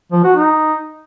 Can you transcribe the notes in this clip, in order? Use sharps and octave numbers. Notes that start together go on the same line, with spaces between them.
F3
F#4
D#4